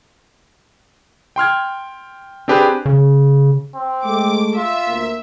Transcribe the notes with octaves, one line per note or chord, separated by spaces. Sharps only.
G5 C6 F6 G#6
C4 D4 G4 G#4 B4
C#3
C4
G#3 A3 D6
F4 E5
D2 A#3